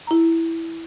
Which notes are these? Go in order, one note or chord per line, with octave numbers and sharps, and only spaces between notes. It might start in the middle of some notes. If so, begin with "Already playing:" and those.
E4 A#5